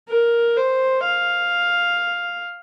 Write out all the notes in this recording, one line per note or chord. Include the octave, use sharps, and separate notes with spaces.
A#4
C5
F5